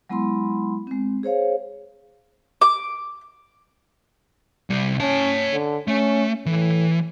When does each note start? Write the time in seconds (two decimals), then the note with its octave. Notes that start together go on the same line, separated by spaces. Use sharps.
0.09 F#3 G#3 B3 E4 B5 C6
0.87 G#3 C4
1.23 G#4 C5 C#5 F5
2.61 D6
4.70 C2 G3
5.00 C#4 C#5 A5
5.53 D3
5.88 A3 C#4
6.46 A2 E3